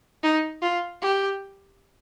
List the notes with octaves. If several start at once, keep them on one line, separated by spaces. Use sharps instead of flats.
D#4
F4
G4